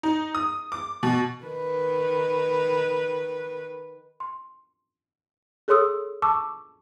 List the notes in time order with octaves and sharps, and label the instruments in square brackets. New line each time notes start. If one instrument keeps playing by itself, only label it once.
[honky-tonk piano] D#4
D#6
D6
B2
[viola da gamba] D#3 B4
[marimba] C6
G#4 A4 C#5 C6 D#6 E6
A5 C#6 D6 E6